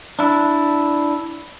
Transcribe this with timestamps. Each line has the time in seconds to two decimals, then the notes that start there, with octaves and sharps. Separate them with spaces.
0.19 D4 E4